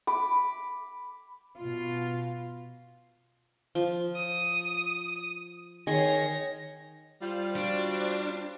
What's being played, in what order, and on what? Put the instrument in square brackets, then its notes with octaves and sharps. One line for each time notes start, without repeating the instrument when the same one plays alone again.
[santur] B5 D6
[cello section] B2 F4
[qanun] F3
[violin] D#6
[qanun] D#3 G#4 C6 [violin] C#5 A#6
[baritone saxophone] G3 [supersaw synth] F4 C5 F5
[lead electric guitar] D4 [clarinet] F#4